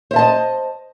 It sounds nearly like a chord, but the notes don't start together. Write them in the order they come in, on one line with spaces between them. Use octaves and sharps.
C5 E5 A5 D#5